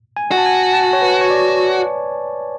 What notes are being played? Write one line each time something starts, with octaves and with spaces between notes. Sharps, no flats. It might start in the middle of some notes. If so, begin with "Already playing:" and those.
G#5
F#4
A5
G#5
A5
C#5
B4
C#5
D5